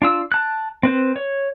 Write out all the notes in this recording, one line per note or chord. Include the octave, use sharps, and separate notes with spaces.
D4 F4 E6
A5 F#6
C4 B4 C5
C#5